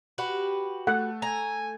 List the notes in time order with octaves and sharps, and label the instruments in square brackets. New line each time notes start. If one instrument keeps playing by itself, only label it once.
[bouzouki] F#4 G4 B4
[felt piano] A3 [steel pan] F#5
[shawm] G#5 [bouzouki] A#5